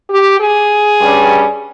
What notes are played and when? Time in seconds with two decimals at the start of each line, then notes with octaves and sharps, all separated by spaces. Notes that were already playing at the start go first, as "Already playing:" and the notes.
0.10 G4
0.41 G#4
1.01 G2 G3 C#4